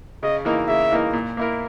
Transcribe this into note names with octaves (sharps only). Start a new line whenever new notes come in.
C#3 D#5
E3 A#3 D#4 A#4
C#3 E5
E3 A#3 D#4 A#4
A#2
A#3 E4 A#4